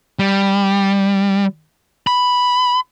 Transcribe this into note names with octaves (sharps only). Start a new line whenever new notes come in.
G3
B5